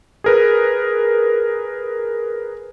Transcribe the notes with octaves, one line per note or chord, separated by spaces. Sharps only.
G#4 A#4 B4